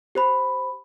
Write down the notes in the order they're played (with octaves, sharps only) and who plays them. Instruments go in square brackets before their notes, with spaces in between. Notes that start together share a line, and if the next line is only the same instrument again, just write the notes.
[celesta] G4 C5 B5